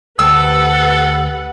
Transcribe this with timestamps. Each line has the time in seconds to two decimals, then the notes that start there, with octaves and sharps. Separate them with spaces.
0.19 D2 G4 A4 B4 F#5 G5 A5 E6